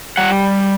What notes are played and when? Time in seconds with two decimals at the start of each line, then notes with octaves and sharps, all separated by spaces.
0.17 G3 F#5